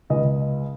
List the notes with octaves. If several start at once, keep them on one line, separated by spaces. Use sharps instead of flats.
C#2 D#5